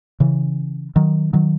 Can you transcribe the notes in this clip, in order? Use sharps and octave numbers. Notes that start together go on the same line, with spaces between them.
C#3 E3
D#3 F#3
D#3 F#3